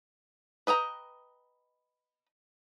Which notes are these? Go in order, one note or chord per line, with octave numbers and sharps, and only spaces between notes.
B4 D#5 G5 A#5